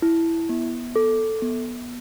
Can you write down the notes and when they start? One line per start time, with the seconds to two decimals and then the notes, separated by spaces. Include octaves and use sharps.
0.02 E4
0.49 B3
0.96 A4
1.42 B3